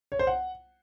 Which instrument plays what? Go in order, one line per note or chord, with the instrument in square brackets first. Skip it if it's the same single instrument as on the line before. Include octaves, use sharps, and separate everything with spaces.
[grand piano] C#5
C5
F#5